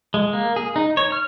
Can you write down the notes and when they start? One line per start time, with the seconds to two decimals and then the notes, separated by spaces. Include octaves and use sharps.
0.14 G#3
0.33 A#3
0.56 G#4
0.76 D#4
0.97 C#5
1.12 F6